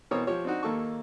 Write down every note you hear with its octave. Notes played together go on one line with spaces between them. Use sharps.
B2 E3 C4 A#4 C#5 D#6
F3 G4 C#5
C4 D4 D#4 F#4
D#2 A#3 A4 A5 C#6